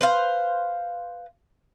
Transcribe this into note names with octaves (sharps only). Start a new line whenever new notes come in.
B4 C5 F5